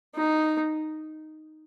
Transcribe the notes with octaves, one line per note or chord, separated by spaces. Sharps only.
D#4